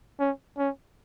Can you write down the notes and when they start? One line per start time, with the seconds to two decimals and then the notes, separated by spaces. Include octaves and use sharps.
0.20 C#4
0.58 C#4